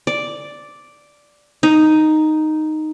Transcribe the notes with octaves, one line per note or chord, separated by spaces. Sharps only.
D5
D#4